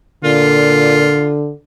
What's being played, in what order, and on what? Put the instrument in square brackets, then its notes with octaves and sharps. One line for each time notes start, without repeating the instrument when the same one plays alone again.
[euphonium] A#2 [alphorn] D3 [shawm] F4